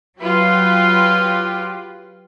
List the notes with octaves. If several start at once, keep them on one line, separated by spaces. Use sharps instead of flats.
F#3 F4 G4 B4